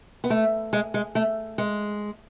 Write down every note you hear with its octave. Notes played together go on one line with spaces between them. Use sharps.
B3
A3
G#3
G#3
A3
G#3